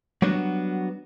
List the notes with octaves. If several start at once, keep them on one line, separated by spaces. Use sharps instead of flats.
F#3 G3 B3 D4 F#4